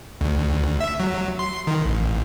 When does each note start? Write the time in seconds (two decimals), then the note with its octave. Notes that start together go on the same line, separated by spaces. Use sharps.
0.21 D2
0.80 E5
1.00 F#3
1.39 C6
1.67 D#3
1.85 A1